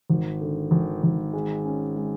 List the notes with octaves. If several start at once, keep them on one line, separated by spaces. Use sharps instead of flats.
G#1
D3
G#1
G#1
G#3
C#4
G#3